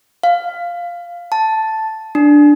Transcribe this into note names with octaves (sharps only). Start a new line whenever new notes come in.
F5
A5
D4